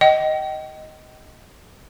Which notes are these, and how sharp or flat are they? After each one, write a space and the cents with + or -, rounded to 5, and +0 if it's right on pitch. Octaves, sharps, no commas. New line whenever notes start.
D#5 +5 G5 -30